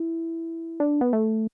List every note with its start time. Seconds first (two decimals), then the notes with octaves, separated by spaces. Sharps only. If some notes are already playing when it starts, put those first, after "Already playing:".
Already playing: E4
0.80 D4
1.01 B3
1.13 A3